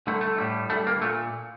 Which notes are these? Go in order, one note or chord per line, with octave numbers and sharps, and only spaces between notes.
D2 D3 G3 A3
A3
A2 G3
D2 D3 G3 A3
A#3
A#2 A3